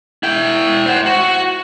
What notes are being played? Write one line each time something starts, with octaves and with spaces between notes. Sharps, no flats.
E4 G5
C5 F#5
F#4